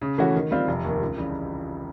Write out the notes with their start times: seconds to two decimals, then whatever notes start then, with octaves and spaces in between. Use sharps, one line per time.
0.01 C#3
0.18 E3 A3 C#4 F#4
0.35 D#3
0.51 G3 C4 F4
0.68 F1
0.84 D#2 D#3
1.01 C#2
1.17 C#3 E3 G3